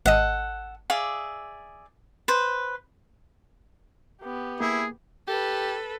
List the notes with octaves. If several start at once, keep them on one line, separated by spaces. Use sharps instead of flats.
G#1 A4 D#5 F#5
G#4 D5 E5 F5
B4 C5
B3 G4
A#3 E4 G#4
G4 A4 B4